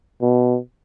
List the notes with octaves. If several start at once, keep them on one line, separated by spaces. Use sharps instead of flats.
B2